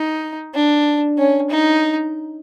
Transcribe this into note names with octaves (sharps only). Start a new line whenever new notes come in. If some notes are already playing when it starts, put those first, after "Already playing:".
Already playing: D#4
D4
C#4
D#4